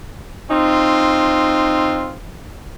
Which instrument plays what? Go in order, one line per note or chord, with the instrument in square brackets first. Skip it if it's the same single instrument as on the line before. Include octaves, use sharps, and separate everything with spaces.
[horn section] C4 D#4 F4